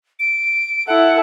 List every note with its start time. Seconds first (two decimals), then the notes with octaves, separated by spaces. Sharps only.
0.19 D7
0.87 E4 A4 F#5